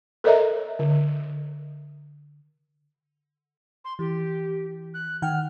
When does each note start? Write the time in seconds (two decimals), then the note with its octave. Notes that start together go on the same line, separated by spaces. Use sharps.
0.24 A4 A#4 C#5 D#5 E5 A#5
0.79 D3
3.84 C6
3.99 E3 G4
4.94 F#6
5.22 D#3 F#5 G5 F6